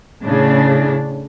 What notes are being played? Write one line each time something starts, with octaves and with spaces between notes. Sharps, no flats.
A2 C#3 D4